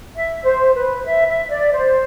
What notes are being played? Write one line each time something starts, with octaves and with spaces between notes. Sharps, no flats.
E5
C5
B4
E5
E5
D5
C5